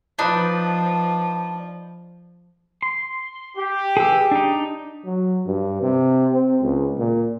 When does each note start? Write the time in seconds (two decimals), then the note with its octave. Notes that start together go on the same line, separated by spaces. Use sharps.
0.19 F3 D4 D#4 B4
2.82 C6
3.57 G4
3.97 G#4 B4 E6
4.31 D4 D#4
5.05 F#3
5.46 G2
5.82 C3
6.32 C4
6.62 C#2
6.99 A#2